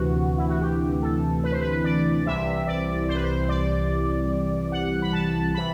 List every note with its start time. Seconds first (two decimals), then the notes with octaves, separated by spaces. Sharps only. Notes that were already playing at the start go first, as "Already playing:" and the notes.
Already playing: D2 C3 E3 F#4
0.37 E4
0.49 F#4
0.61 G4
1.02 A4
1.44 B4
1.52 C5
1.61 B4
1.84 D5
2.25 C2 C3 E3 E5
2.67 D5
3.08 C5
3.15 B4
3.24 C5
3.49 D5
4.72 F#5
5.02 B5
5.13 A5
5.54 C3 E3 B5